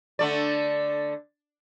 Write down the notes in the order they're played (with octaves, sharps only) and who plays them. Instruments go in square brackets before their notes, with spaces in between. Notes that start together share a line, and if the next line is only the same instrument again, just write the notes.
[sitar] D3 A3 D5